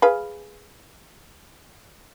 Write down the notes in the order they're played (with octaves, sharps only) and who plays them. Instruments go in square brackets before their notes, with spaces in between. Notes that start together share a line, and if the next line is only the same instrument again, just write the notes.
[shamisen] G#4 B4 F5